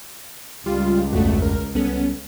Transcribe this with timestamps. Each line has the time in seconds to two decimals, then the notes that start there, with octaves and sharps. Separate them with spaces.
0.66 C#2 G3 F4
1.13 A#1 E2 G2 A3 F#4
1.42 A#4
1.75 C2 G3 B3 C#4 A4